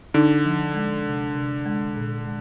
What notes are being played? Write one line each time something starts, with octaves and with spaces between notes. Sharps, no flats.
D3 D#4
F3
G#3
C3
C3
G#3
A#2
G#3